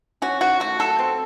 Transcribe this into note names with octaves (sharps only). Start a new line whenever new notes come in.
C#4 F#4
D#3 F#4
A3 F#4
F#3 A4
C4